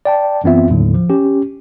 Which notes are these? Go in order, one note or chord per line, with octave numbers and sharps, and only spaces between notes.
D5 G5 A5
F#2 E3 B3 C4 F4 E5
D#2 A2 D3 F#3
F3
C#4 G4